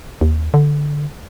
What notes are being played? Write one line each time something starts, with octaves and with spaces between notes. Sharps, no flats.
D#2
D3